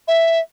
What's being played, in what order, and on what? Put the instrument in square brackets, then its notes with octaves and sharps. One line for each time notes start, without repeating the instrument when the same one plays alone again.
[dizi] E5